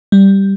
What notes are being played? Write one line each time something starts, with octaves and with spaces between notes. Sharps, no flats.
G3